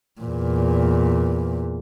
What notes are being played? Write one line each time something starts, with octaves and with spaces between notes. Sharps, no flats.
E2 A#2